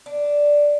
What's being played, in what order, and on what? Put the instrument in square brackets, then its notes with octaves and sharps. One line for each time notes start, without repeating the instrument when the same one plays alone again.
[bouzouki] D4